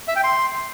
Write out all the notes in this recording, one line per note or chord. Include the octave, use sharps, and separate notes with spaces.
E5
G5
C6